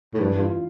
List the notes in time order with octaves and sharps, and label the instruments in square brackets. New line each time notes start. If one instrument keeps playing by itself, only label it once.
[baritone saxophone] A2
[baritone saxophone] G2 [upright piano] E3
[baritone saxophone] G2
[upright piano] F4